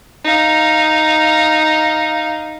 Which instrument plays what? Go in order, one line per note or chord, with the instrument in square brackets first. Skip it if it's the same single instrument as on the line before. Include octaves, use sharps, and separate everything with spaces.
[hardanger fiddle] D#4 F5